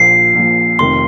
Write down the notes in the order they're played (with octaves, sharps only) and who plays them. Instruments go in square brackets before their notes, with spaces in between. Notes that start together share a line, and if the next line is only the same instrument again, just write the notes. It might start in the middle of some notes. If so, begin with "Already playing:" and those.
Already playing: [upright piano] A#1 A#2 F3 [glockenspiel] C7
[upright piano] A#1 A#2 F3
[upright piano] F1 F2 D#3 [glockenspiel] C6